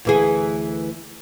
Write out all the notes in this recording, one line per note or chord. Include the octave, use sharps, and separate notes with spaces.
D2 E3 G#4